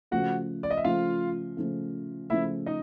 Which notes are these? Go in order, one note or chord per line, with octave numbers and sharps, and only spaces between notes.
C#3 F3 A3 F#4 F#5
D5
D#5
E5
C#3 F3 A3 F4 F5
C#3 F3 A3
C#3 F3 A3 E4 E5
D#4 D#5